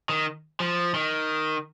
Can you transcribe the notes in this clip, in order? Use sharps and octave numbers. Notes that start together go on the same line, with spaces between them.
D#3
F3
D#3